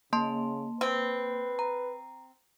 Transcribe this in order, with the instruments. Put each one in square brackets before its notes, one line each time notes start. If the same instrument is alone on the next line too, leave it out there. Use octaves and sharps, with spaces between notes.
[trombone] C#3 [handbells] A#3 A5 C6
[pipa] C4 [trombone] B4
[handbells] A#5